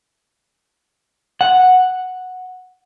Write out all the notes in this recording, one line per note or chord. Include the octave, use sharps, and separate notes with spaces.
F#5